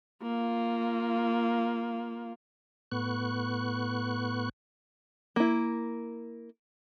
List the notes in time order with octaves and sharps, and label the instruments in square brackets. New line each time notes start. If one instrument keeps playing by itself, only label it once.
[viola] A#3 F4
[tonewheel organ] A2 B3 C#6 F#6
[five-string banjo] A#3 E4